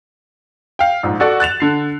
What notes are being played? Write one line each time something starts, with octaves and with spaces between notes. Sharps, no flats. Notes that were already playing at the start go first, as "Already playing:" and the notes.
F5 G5
A#1 G#2
F#4 A4 D5 F#5
F#6 A6 E7 F7
D3 C7